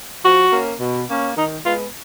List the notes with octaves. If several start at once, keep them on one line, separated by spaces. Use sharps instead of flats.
F3 F#4
A#3 C#4
B2
A#3 C#4
D#3 D#4
G#3 B3 F4